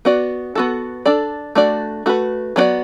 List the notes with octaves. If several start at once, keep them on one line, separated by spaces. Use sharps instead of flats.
B3 F#4 D5
B3 F#4 A4
D4 A4 D5
A3 D4 F#4 D5
A3 F#4 B4
F#3 B3 D4 F#4 D5